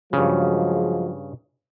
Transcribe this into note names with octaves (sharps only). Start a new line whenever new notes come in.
G2 C#3 F3 F#3 G#3